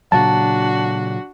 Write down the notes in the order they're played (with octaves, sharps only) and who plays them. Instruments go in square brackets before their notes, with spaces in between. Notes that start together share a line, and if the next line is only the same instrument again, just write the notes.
[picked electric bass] A#2 C#3 F#3 [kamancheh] D4 F#4 [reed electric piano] A5